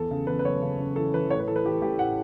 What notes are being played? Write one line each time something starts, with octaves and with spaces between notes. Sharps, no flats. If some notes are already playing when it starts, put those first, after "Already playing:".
Already playing: E2 A4
C#3
E2 B4
B4
F#1 C#5
C#3
C#3
E3 A4
E3 B4
A2 C#5
B4
E3 A4
B4
E3 G4
A1 G4
A2 F#5